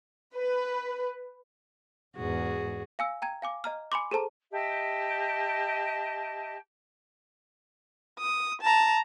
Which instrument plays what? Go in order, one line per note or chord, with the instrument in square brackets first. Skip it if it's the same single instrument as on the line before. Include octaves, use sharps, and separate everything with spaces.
[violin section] B4
[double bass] E2 G#2 [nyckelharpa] F#4 G#4
[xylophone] F5 G#5 E6
G5 A#5 G#6
F5 G#5 D6
D#5 A#5 F6
G#5 B5 C6 D6
G#4 A4 C5 A5 A#5
[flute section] G4 D#5 E5 A5
[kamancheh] D#6
A5 A#5